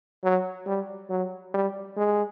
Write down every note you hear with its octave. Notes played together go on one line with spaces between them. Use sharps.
F#3
G3
F#3
G3
G#3